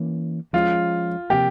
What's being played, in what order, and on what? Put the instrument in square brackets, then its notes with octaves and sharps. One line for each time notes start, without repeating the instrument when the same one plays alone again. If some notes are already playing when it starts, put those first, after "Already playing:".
Already playing: [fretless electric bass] E3 A#3 C#4
[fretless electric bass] F3 G#3 C#4 [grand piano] F4
[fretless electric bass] C3 F3 A#3 [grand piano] G4